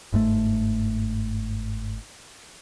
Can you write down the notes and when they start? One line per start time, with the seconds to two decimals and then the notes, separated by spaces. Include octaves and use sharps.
0.12 G1 G#2 C#3 A3